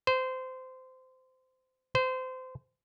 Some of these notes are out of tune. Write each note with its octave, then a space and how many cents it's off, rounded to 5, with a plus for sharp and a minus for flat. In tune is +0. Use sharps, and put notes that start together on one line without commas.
C5 -20
C5 -25